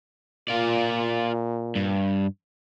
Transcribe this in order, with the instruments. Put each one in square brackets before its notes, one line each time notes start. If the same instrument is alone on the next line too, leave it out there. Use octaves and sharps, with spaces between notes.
[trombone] A#2 [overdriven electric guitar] F4 D5
[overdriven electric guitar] G2